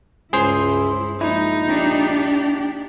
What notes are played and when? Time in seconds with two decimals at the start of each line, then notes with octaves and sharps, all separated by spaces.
0.33 C#2 G2 E4 G#4 C5 C6
1.21 A#1 G#3 D#4 E4
1.68 D4 G4